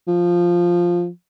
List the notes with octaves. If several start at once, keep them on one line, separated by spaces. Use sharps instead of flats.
F3